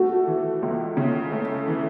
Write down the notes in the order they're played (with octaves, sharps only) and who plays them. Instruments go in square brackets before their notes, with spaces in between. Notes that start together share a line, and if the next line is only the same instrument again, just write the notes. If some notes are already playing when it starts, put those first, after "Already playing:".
Already playing: [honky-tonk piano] A3 [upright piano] F#4
[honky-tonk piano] E3
C#2
C#3
A3
E3